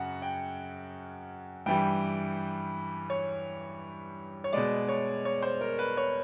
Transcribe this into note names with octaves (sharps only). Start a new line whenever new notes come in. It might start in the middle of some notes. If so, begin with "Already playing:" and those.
Already playing: F#2 C#3 F#3 F#5
G5
G2 E3 G3 G5
C#5
C#5
B2 G#3 D5
C#5
C#5
C5
A#4
B4
C#5